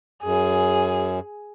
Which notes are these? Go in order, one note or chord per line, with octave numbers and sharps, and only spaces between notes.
F#2 G#4